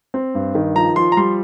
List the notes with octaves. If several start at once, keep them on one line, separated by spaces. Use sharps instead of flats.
C4
G2
D#3
F3 A#5
F3 C6
A#5
G3 C6